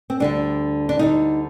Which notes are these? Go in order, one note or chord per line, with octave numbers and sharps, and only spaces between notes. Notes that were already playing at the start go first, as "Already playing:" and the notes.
C4
D2 D3 G3 D4
D4
D2 D3 G3 D#4